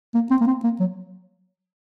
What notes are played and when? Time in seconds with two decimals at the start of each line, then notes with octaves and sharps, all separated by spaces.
0.15 A#3
0.31 C4
0.41 A#3
0.47 C4
0.64 A#3
0.80 F#3